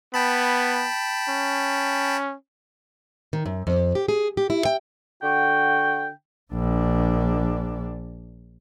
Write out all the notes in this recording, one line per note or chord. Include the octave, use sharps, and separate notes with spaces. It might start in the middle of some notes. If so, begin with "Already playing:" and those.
B3 G5 A5 B5
C#4
D#3
F#2
F2
G4
G#4
G4
E4
G5
D3 F#4 G5
A#1 D4